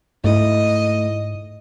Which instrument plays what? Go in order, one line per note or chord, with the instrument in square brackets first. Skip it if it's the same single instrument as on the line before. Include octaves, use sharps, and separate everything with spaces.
[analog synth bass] G#2 [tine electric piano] A3 E4 [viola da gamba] D#5